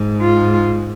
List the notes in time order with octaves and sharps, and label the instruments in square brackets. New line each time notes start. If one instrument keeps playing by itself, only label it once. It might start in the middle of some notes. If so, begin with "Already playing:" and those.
Already playing: [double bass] G#2
[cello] F4